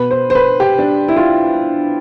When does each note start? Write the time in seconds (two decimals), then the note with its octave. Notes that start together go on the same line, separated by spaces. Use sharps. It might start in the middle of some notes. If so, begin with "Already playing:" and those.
Already playing: B2 B3 B4
0.11 C5
0.30 C5
0.35 B4
0.60 G4
0.78 D4
1.08 E4
1.16 F4